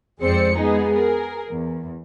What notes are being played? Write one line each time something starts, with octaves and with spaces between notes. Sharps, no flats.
F2 G#3 C4 C5 D5 C#7
G#3 B3 D#4 G#4
G#4 A#4
E2